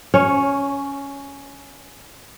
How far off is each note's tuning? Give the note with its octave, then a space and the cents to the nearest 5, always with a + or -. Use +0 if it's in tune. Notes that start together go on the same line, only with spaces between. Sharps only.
C#4 +10 C#5 -10